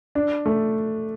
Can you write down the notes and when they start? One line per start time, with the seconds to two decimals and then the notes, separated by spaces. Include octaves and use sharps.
0.15 D4
0.46 A3